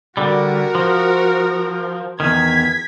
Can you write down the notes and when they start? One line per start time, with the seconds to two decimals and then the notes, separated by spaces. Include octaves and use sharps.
0.17 D3 G3 F#4 A#4
0.75 F3
2.20 E2 D#3 G#6 B6